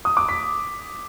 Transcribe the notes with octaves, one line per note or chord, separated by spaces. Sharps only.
D#6
D6
B6